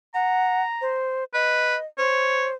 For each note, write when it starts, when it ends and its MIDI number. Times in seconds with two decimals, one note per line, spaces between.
0.14 0.62 78
0.14 0.97 82
0.81 1.24 72
1.34 1.76 71
1.34 1.85 75
1.98 2.54 72
1.98 2.46 73